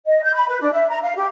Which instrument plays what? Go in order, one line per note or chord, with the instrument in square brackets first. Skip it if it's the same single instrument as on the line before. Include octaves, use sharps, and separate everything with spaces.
[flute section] D#5
G6
B5
B4
D4
E5
A#5
F5
G4